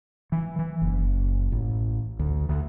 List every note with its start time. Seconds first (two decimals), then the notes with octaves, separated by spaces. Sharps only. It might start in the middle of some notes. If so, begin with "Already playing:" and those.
0.32 E3
0.59 E3
0.81 F#1
1.52 A1
2.19 D2
2.49 D2